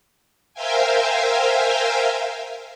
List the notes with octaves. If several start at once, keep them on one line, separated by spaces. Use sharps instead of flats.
A#4 C5 E5 F5 G5 G#5